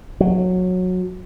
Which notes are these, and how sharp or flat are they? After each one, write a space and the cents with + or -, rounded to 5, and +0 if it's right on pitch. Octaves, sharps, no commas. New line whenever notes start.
F#3 -15